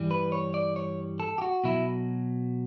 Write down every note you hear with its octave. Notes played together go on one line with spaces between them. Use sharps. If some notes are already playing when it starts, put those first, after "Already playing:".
Already playing: G2 E3 G3
B4
C#5
D5
C#5
A4
G4
F#4
B2 F#3 E4